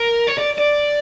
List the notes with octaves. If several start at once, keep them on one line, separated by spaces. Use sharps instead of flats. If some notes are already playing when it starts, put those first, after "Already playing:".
Already playing: A#4
C#5
D5
D5